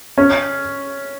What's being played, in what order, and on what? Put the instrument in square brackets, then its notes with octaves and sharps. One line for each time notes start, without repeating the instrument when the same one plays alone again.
[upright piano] C#4